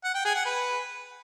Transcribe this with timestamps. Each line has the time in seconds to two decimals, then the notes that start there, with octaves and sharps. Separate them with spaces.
0.04 F#5
0.14 G5
0.25 G#4
0.35 F#5
0.45 B4